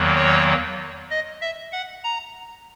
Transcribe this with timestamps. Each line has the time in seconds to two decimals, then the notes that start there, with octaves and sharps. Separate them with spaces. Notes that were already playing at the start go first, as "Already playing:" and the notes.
Already playing: E2 D#3 F#3 A#3
0.16 C#5
1.10 D#5
1.41 E5
1.73 F#5
2.04 A#5